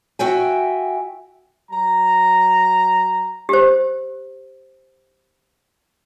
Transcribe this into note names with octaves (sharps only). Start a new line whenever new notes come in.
F#4 E5 G5 G#5
F#3 A#5
G4 C5